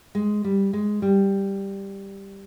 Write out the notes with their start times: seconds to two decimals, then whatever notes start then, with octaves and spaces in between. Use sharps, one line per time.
0.15 G#3
0.44 G3
0.73 G#3
1.02 G3